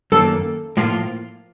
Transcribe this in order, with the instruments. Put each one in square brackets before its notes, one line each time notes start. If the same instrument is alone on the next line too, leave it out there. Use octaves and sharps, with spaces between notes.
[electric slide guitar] F#2 D#3 A#3 [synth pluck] A4
[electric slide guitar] A2 F3 A#3 F4